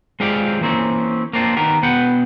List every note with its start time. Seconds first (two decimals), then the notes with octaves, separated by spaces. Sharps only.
0.20 G#3 C4 F4 G4 D5 F5
0.61 E3 A#3 C4 C#4
1.33 A#3 C4 D4 F4
1.57 D#3 B3 G4 A#4
1.82 B2 B3 F#5 G5